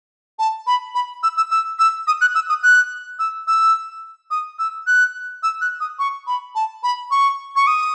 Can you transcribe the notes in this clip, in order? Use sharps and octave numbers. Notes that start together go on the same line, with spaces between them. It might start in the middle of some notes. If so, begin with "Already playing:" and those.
A5
B5
B5
E6
E6
E6
E6
D#6
F#6
E6
D#6
F#6
E6
E6
D#6
E6
F#6
E6
F#6
D#6
C#6
B5
A5
B5
C#6
C#6
D#6